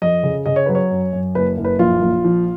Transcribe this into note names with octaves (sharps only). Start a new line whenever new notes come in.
F2 D#5
C#3
C#3 D#5
C#5
F#3 B4
C#5
F#2
F#2
F#1 B4
F#1
B4
A#1 F4
A#1
F3